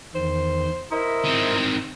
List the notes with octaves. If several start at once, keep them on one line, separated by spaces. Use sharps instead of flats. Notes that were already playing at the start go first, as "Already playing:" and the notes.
E2 D#3 C5
E4 A#4 C5 D#5
D#3 C4